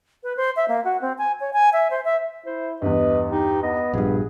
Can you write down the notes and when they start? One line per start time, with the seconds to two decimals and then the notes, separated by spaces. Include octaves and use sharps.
0.23 B4
0.37 C5
0.56 E5
0.68 A#3
0.84 F#4
1.01 C4
1.18 G#5
1.40 C#5
1.53 G#5
1.73 E5
1.90 C5
2.05 E5
2.46 E4 C5
2.82 E2 G2 B4 D#5
3.31 D#4 G4
3.63 B3 D#5
3.93 A#1 G2 G#4